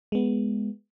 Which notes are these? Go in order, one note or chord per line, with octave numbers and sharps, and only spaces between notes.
G#3 B3